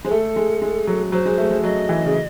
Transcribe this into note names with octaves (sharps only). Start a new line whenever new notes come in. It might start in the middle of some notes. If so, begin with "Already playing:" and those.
G#3 C5
A3 A4
G#3
G#3
F#3
F#3 C5
G#3
A3
G#3
F#3 D#5
E3
C#3